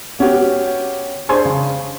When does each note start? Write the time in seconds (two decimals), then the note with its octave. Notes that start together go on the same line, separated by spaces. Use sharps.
0.19 B3 C#4 F#4 G4
1.29 D4 G#4 C5 G#5 C6 C#6
1.45 C#3